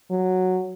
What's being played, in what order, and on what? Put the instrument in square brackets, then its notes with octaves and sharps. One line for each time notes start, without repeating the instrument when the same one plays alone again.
[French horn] F#3